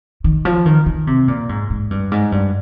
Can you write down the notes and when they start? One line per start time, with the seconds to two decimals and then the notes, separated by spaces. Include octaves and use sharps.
0.24 D#3
0.45 F3
0.66 D#3
0.86 D#3
1.07 C3
1.28 A#2
1.49 G#2
1.70 G#2
1.91 G2
2.12 G#2
2.32 G2